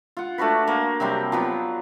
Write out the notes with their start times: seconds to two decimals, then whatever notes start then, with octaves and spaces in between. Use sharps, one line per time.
0.17 F4 F#5
0.38 A3 D4 F#4 B4
0.67 A#3
1.00 C3 F#3 G3 C4
1.32 F3 F#3 B3